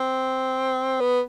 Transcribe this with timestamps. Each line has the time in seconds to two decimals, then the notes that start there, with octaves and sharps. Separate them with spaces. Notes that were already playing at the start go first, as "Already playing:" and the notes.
Already playing: C4
1.00 B3